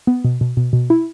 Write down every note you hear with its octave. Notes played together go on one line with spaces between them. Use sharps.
B3
B2
B2
B2
B2
E4